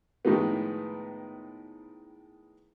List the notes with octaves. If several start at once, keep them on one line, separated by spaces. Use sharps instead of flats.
A2 D#3 F3 G#3 B3